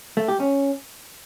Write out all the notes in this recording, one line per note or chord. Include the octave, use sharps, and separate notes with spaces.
A3
G4
C#4